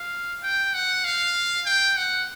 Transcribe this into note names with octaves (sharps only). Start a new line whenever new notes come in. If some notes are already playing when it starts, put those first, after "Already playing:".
Already playing: F5
G5
F#5
F5
G5
F#5